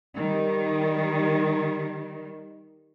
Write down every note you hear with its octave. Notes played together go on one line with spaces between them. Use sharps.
D#3 G3